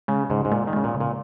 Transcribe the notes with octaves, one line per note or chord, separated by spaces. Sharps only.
C#3 G#3
G#2 C#3
G#2
A#2 G#3
D#3
C#3 G#3
A#2
C#3
A#2